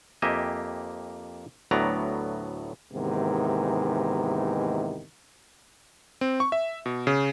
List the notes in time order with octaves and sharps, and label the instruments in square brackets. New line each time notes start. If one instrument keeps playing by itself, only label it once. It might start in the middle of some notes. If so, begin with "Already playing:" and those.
[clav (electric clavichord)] F2 A#3 G4 D#5 E5 G#5
D2 A2 F#3 B3 D5 A#5
[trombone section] D#2 G#2 C3 D#3 E3 B3
[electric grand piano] C4
C#6
E5
B2
C#3